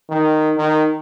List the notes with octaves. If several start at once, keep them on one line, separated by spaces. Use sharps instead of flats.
D#3
D#3